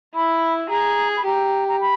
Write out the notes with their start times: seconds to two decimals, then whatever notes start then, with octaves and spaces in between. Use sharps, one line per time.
0.15 E4 B5
0.70 G#4 A#5
1.17 B5
1.25 G4 A#5
1.68 A#5
1.81 B5